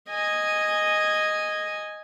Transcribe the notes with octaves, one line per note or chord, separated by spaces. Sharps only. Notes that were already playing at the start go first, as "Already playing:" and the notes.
D#5 G#5